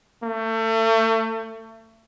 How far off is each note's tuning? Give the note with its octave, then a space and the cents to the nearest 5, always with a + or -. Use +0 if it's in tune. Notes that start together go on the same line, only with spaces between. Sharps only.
A3 +30